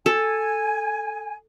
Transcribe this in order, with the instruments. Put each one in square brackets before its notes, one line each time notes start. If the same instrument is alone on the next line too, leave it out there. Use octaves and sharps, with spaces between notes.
[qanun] A4 [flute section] G#5